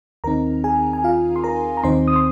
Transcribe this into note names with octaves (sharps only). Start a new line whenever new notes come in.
D#2 D#3 C4 D#4 A#4 A#5
G#4 G#5
G#5
F4 F5
C6
A#4 A#5
A#5
D#2 D#3 C4 D#4 C5 C6
D#6
C6